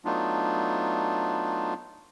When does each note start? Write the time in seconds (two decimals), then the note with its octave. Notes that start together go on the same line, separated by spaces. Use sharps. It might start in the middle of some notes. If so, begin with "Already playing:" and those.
0.05 F#3 A3 B3 D4 D#4 F4